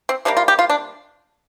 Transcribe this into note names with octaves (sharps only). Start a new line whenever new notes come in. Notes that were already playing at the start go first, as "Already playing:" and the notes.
C4
C3 G3 A#3 D4
F4
G4
F4
D4